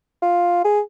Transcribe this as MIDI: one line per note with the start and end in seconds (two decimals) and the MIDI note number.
0.22 0.61 65
0.65 0.80 68